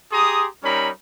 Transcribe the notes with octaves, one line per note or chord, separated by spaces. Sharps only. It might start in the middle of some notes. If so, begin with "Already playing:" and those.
G4 G#4 A#5 C6 D#6
G3 C#4 D#4 A#4 C#5 B5